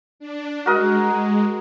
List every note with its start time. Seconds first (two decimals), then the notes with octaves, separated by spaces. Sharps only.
0.19 D4
0.66 G#3 F#4 A#4 D#5